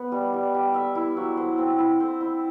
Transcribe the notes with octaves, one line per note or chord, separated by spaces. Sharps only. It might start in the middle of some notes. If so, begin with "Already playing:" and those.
Already playing: B3 D#5
G3
G3
G3
E5
E4
F#3
C5
C4
E4
C5
E4